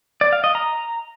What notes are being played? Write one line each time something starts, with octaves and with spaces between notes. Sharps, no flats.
D5
F5
D#5
A#5